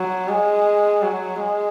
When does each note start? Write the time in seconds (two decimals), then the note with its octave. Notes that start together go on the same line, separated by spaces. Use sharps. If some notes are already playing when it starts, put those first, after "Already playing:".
Already playing: F#3
0.28 G#3
1.02 F#3
1.40 G#3